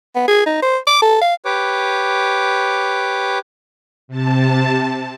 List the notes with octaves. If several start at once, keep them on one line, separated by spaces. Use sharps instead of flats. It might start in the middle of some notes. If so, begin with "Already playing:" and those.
B3
G#4
D#4
C5
D6
A4
F5
G4 B4 C#5 D6
C3 A5